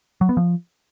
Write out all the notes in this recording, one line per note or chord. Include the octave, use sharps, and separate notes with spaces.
F#3
B3
F3